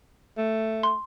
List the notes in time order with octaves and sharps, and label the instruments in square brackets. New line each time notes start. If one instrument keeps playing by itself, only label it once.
[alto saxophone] A3
[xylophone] C6